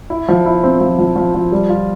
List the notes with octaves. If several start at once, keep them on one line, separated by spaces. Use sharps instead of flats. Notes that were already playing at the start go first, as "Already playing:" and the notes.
E4
F3
E4
C4
F3
F3
F3
F3
G3
F4